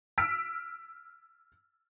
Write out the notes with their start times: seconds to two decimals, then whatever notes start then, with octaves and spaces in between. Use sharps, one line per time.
0.18 E6 F6 B6 D7